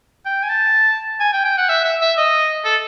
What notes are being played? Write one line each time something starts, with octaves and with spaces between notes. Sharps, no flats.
G5
G#5
A5
G#5
G5
G5
F#5
E5
E5
E5
D#5
A4